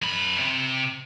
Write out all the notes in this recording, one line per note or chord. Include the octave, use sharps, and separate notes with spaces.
F#2 B5
C3